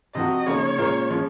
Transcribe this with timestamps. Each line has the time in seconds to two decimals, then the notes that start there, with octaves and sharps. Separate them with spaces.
0.15 C3 F3 C4 F#4 D#5
0.46 C#3 F3 A#3 D#4 C#5
0.78 A#2 G#3 C#4 F4 A#4
1.10 F3 G#3 C#4